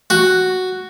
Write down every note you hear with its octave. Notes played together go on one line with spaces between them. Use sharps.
F#4